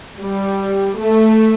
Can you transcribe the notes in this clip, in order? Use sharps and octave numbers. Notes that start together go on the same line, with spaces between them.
G3
A3